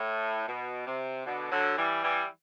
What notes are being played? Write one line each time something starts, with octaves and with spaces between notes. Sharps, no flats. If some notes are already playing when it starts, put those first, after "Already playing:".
Already playing: A2
B2
C3
B2 D3
D3 F#3
E3 G3
E3 G3